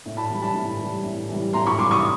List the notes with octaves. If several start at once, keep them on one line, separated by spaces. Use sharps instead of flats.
A2
A5 B5
E3 G3
A5 B5
A2
E3 G3
A2
E3 G3
A2 A#5 C6
B5 C#6
E3 G3 C6 D6
C#6 D#6